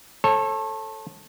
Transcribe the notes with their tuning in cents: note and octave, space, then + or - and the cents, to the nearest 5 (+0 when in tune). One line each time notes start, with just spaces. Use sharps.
A4 +0 C#5 -35